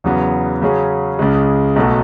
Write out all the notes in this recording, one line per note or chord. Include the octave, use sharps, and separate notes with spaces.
E2 C#3 F#3 B3
C#3 F#3 C#4 G#4
C#2 C#3 G#3
B1 B2 F#3 A3